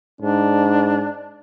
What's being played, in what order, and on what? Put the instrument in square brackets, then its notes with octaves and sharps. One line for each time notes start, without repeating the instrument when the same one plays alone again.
[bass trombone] G#2 [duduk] D4